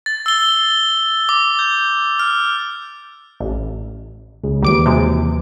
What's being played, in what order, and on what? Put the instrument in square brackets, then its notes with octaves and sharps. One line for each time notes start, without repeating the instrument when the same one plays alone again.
[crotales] A6
E6 G7
D6
G6
F6
[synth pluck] A1
[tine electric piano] C#2 C#3
[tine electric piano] D#2 E3 [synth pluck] G3 D6 D7
[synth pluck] C3 F#3 G#3